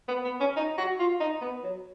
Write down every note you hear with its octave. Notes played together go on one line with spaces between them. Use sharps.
B3
B3
C#4
D#4
F#4
F4
D#4
B3
F#3